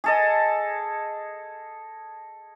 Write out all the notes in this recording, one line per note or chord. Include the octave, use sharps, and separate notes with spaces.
G#4 A4 D#5